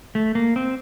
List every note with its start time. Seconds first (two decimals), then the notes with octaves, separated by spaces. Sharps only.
0.15 A3
0.35 A#3
0.56 C4